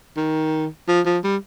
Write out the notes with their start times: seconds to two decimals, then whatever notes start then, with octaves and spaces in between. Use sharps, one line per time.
0.17 D#3
0.88 F3
1.06 F3
1.24 G3